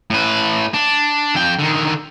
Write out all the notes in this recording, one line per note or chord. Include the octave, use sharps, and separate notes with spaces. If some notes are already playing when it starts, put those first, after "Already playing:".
A2 B4
D4
F2 G5
D3 D#3